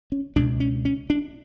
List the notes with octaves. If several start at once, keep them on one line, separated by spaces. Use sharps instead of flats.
C#4
C#2 B2 D4
C#4
C#4
D4